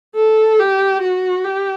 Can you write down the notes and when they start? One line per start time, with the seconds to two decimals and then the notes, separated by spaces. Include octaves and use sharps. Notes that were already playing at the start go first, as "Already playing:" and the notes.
0.15 A4
0.59 G4
1.02 F#4
1.44 G4